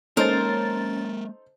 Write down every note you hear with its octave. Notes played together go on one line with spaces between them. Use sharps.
G#3 A#3 C#4 D#4 A4 A#4 C5 A6